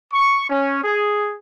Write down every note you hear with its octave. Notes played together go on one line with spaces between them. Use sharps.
C#6
C#4
G#4